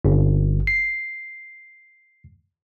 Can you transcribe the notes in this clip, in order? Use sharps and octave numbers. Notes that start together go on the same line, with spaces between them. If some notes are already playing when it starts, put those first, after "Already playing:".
G1
C7